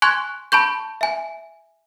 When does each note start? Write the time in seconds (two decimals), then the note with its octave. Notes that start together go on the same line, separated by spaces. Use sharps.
0.02 G#5 C6 C#6 F#6 G#6
0.52 A5 B5 C#6 G6
1.01 E5 G#5